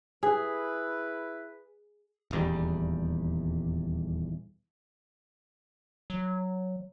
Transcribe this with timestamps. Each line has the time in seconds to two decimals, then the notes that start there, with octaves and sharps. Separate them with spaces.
0.23 E4 G#4 B4
2.31 D#1 E2 G3
6.10 F#3